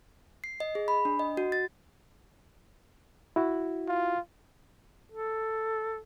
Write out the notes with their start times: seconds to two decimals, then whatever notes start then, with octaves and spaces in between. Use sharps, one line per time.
0.44 C7
0.60 D#5
0.75 G#4
0.88 B5
1.05 D4
1.19 D#5
1.37 F#4
1.52 A6
3.36 E4 F#4
3.88 F4
5.10 A4